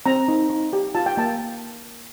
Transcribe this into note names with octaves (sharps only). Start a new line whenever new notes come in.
C4 A#5
D#4
D#4
G4
F4 A5
G5
A#3 A5